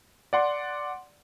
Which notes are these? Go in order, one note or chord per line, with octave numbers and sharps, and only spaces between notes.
D5 F#5 C6